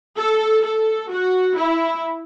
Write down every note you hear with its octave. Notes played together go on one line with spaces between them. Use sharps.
A4
A4
F#4
E4